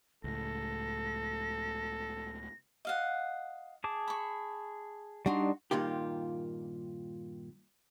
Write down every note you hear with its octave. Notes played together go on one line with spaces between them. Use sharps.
C#2 A2 A4 A#6
D#5 F5 F#5
G#4 A5 D6
B5 C#6
G3 D4 D#4 F#4 C6
G2 A#2 D#3 F4 G4